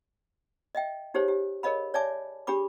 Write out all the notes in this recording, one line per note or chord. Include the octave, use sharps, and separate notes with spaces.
D#5 E5 G5
D#4 G4 G#4 C5 C#5
G4
G#4 A#4 C#5 D#5 F5 B5
C#5 D5 E5 G#5 A5 D6
D4 G4 G#4 B5 D6